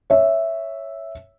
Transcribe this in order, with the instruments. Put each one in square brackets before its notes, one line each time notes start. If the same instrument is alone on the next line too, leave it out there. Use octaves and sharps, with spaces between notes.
[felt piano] C#5 E5